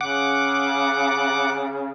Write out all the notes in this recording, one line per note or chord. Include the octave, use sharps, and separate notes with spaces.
C#3 F#5 D6